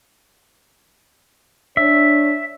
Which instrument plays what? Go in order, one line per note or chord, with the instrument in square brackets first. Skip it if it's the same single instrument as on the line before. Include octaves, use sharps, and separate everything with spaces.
[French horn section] D4 C#5 [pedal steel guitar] E5